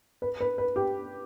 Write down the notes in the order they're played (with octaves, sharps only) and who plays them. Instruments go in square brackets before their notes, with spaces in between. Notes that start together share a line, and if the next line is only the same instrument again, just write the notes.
[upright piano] B4
B4
B4
G4